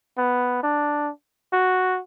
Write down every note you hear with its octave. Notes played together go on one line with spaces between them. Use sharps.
B3
D4
F#4